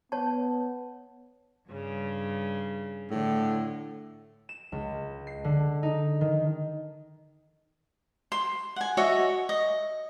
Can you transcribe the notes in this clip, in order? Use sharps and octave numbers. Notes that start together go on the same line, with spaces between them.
B3 C#5 A5
G2 C#3
A2 D3
E7
C#2
C7
D3
D#4
D#3
C6
F#5 G#5
F#4 C#5 D#5 E5
D#5